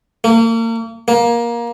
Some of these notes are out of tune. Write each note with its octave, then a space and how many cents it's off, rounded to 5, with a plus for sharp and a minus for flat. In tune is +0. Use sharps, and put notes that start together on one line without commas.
A#3 -35
A#3 +20